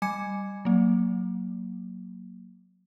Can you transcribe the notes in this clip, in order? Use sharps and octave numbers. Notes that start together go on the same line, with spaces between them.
G3 G#5 D6 G#6 C#7
F#3 A#3